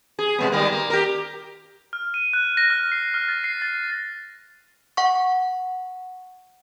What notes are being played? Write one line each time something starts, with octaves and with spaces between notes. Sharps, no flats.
G#4
B2 G#3 B3
D#3 G3 A#3
A#3
G4 A#4
F6
D#7
F#6
A#6
F6
C7
F6
A6
C7
A6
F#5 C#6